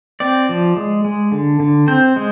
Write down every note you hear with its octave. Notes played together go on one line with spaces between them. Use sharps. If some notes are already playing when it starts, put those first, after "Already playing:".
C4 D5
F3
G#3
G#3
D3
D3
C4 C5
G#3